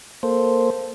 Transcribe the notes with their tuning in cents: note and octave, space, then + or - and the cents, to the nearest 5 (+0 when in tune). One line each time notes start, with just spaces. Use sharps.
A#3 +0 A4 +0 C5 +0